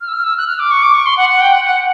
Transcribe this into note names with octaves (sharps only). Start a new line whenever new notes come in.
F6
E6
F6
E6
F#6
F6
D6
C#6
D6
C#6
C6
F#5
F#5
G5
F#5
F#5